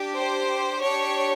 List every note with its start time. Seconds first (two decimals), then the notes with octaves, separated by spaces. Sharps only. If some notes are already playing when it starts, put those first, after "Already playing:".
Already playing: D4 G4
0.15 C5
0.81 D4 G4 C#5